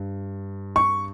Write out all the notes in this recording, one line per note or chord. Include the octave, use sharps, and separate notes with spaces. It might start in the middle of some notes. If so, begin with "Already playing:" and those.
Already playing: G2
C#6